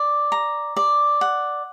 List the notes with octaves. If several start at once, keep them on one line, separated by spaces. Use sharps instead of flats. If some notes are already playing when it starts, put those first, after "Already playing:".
Already playing: D5
A#5
D5
F#5